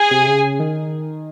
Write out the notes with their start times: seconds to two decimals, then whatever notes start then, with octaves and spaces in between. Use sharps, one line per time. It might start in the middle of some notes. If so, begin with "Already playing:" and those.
Already playing: G#4 G#5
0.11 C3
0.27 C#3
0.60 D#3